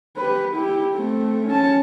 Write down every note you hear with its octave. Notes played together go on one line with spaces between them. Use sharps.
G4 B4
E4 G4
A3 C4
C#4 A5